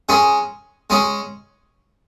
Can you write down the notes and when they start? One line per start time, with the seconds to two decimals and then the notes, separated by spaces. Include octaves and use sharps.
0.09 G#3 C#4 G#4
0.90 G#3 C#4 G#4